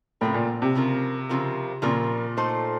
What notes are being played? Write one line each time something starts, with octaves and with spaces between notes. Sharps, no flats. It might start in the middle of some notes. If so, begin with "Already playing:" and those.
A2 C#3 F3 C4 F4 A#4
A#2
C3
C#3 F3 C4 F4 A#4
C#3 F3 C4 F4 A#4
A#2 C#3 F3 C4 F4 A#4
A3 D#4 A4 C5